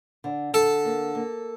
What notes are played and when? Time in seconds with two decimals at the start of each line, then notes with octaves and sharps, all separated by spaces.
0.24 D3
0.53 D3 A4
0.85 A#3
1.15 A#3